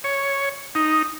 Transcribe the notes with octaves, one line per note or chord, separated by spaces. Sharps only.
C#5
D#4